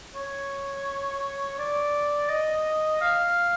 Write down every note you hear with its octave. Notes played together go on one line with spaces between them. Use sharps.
C#5
D5
D#5
F5